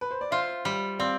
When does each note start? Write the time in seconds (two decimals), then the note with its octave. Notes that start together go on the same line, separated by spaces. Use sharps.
0.01 B4
0.11 C5
0.21 D5
0.31 F4 C5 E5
0.65 G3
0.99 C4 D5 F5